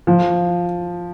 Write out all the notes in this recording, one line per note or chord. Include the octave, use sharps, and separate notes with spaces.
F3